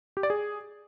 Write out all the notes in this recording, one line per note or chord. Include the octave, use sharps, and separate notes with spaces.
G4
D5
G#4